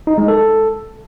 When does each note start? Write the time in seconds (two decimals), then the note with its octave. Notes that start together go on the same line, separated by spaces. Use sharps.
0.07 D#4
0.18 G#3
0.28 A4